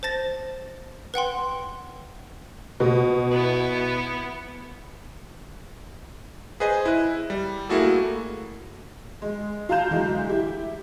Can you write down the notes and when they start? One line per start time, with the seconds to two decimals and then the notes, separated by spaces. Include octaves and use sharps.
0.03 C5 A5 A6 A#6
1.14 B4 F#5 G5 C6
2.80 B2
3.31 B3 E4
6.60 G#4 B4 C5 D#5 G#5
6.86 E4 F#6
7.30 G3
7.69 A3 A#3 E4 F#4 G#4 A4
9.22 G#3
9.69 F4 F5 A5 A#5 G6 E7
9.90 D2 E3 F#3 G#3
10.29 E4 G4